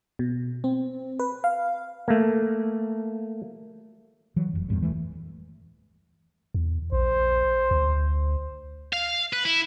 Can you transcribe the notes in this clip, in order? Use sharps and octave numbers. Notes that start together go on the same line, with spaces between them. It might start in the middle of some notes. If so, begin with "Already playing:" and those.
B2
C4
B4
F5
A3 A#3
E3 F#3
F1 F#2
F1 E2 G2 A#2
D#2 E3 F#3 A3
E2
A#1 C5
D2
F5
B4
E4